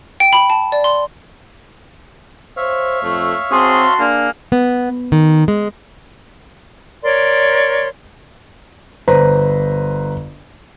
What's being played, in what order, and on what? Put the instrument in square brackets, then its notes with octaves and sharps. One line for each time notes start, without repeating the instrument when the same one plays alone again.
[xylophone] G5
B5
A5
D5
C6
[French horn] C5 [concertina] C#5 E5 F5
[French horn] F2 [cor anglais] A3
[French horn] C4 [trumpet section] F#4 A5 C6 [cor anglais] G#4
[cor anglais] A#3 [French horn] D4 [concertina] G#4
[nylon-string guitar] B3
D#3
G#3
[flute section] A#4 C#5 D5 C6
[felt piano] G1 B4 C5 A#5